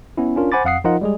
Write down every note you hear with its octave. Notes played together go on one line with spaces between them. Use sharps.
B3 C#4 E4
C#4 D4 F4 A#4
C5 F#5 G#5 B5 D6 A6
F2 F5 F#5 D#6 C7
F3 D#4 F4 A#4 D#5 F#5
G3 G#3 G#4